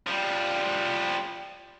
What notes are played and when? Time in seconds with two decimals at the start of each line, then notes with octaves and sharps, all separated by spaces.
0.07 F3 G3